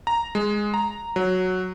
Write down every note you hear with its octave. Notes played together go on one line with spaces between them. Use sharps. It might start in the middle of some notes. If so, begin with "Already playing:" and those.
A#5
G#3
A#5
F#3